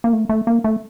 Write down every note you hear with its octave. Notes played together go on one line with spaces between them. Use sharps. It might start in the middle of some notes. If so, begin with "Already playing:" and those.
A#3
A3
A3
A#3
A3